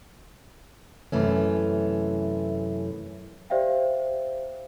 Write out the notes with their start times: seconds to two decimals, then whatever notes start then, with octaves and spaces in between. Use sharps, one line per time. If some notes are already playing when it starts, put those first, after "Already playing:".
1.12 F#2 C3 E3 A3 C#4
3.50 G4 C5 D5 E5 F5 G5